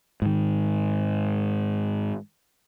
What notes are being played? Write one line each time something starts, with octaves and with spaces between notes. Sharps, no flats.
G#2 D#3